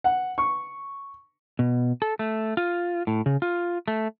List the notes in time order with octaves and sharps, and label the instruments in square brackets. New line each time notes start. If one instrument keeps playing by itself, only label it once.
[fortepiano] F#5
C#6
[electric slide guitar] B2
A4
A3
F4
A2
C#3
F4
A3